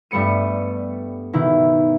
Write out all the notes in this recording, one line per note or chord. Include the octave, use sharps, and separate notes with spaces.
G2 G3 A3 B3 C#7 D#7
B2 D#3 E4